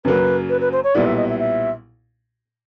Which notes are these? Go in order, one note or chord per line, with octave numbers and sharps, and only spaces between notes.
F#2 C#3 F#3 A#3 B4
B4
B4
C5
C#5
B1 A#2 G3 B3 E4 D5
E5
D#5
E5
E5